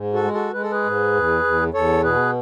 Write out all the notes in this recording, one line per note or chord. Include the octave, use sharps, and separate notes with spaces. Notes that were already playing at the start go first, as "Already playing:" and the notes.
Already playing: G#2
F#4 A4
G#3
F#4 A4
G#3 B4
A4
G#4 B4
G#2
E2
E2
E2 A4 C#5
B2 G#4 B4